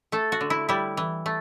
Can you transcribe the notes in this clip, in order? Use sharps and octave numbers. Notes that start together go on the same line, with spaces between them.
A3 A4
F#4
D3
E4
G3 E4
E3
A3